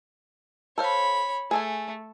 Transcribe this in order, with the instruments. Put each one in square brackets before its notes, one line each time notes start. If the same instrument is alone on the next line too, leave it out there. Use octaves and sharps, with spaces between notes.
[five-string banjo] A4 C5 F5 [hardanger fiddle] C#5 B5
[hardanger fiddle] A3 [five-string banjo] G#4 A4 G#5